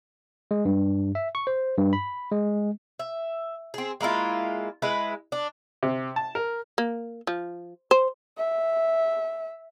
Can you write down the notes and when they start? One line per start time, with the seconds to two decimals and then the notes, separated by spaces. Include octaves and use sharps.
0.51 G#3
0.65 G2
1.15 E5
1.35 C#6
1.47 C5
1.77 G2
1.93 B5
2.31 G#3
2.99 E5
3.74 C4 G#4
4.01 G#3 A#3 E4 F4
4.82 G#3 E4 B4
5.32 D4
5.83 C3
6.16 A5
6.35 A#4
6.78 A#3
7.27 F3
7.91 C5
8.37 E5